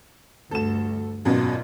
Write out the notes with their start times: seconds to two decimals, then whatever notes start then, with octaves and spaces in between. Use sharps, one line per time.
0.51 D2 G2 A4 E7
1.25 G#1 F#2 B2 F4